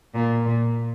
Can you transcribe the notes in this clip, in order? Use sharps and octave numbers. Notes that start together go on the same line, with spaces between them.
A#2
A#2